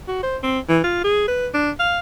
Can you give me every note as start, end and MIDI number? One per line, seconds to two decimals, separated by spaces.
0.08 0.20 66
0.23 0.37 72
0.43 0.59 60
0.69 0.81 52
0.84 1.02 65
1.04 1.28 68
1.28 1.48 71
1.54 1.70 62
1.79 2.00 77